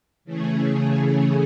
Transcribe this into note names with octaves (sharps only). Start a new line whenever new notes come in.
C#3 E3 A3 C#4 G#4